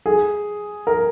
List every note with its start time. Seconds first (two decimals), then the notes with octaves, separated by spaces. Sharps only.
0.06 G#4
0.87 A#4